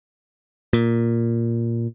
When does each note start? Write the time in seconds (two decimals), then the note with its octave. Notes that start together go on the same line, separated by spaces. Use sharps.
0.73 A#2